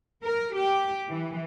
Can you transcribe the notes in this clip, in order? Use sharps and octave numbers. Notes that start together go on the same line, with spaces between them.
A#4
G4
E3